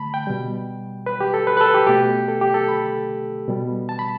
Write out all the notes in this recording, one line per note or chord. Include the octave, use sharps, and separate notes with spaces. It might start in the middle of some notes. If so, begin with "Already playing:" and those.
Already playing: D3 A3 A5 B5
G5
B2 G3
B4
G4
A4
B4
B4
A4
G4
B2 A3 G4
A4
G4
A4
B5
B2 G3
A5
B5